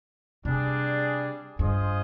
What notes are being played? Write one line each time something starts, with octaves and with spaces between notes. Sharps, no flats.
C3 G3 D4 G#4 D5
G2 F4 G#4 C5 D#5